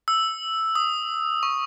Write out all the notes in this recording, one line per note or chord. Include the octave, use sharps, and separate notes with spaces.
E6
D#6
C#6